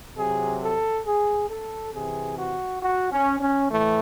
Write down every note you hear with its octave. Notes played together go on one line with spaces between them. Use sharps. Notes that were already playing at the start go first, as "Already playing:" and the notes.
C3 F#3 G#4
A4
G#4
A4
C3 E3 G#4
F#4
F#4
C#4
C#4
A2 E3 A3